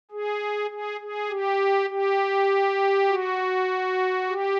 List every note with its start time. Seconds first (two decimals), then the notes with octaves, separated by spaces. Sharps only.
0.11 G#4
0.70 G#4
1.00 G#4
1.30 G4
1.90 G4
3.09 F#4
4.29 G4